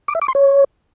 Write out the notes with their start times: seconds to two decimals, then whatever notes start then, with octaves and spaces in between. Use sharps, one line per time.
0.08 D6
0.15 E5
0.22 D6
0.28 C6
0.35 C#5